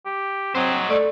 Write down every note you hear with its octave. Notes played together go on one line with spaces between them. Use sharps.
G4
F#3 C4 C5 D#5
A3 D5